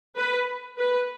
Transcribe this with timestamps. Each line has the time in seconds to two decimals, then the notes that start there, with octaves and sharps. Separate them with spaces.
0.17 B4
0.78 B4